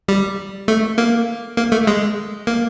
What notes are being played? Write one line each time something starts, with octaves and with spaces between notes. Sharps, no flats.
G3
A3
A#3
A#3
A3
G#3
A#3